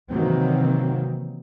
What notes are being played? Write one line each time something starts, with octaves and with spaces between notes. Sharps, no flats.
C3 D#3 E3 F#3 A#3 C4